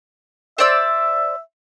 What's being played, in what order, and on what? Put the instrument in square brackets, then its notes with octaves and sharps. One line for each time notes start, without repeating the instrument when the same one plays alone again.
[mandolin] C5 D5 E6 [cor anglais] E5